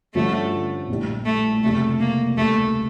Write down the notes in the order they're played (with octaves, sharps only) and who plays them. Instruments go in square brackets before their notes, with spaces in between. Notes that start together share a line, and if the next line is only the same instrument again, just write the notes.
[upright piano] G2 D3 F3 C#4 [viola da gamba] A3
[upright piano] A#1 A2 G3
[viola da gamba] A3
[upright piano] F1 F2 C#3 G3 D4 [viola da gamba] A3
[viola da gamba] A#3
[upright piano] D2 C#3 G3 D4 A4 [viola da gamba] A3